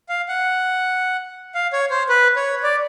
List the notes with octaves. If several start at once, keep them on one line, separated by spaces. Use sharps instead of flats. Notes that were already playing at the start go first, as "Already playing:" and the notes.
F5
F#5
F5
C#5
C5
B4
C#5
D5